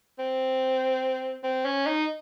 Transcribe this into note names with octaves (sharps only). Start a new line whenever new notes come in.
C4
C4
C#4
D#4